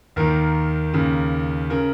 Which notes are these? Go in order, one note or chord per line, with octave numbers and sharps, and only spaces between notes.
D#2 D#3 A#4
D#2 C#3
C#3 A#4